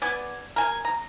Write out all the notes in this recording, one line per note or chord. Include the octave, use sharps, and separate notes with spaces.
B3 D5 G#5
A#4 G#5
A#5